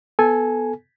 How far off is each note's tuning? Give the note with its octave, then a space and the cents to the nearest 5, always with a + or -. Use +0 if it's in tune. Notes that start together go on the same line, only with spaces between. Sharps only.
B3 +0 A4 -15 G#5 +0